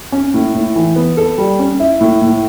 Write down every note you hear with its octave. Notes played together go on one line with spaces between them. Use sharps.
C#4
A2
A2
E3
B3
A4
G3
C#4
E4
A2
A2